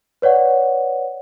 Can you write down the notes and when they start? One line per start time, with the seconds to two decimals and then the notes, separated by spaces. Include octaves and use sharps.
0.22 B4 C#5 D5 F#5